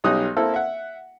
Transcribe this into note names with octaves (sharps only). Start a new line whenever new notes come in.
B1 G3 C#4 D#4 D#6 F#6
A#3 C4 E4 A4
E5 F#5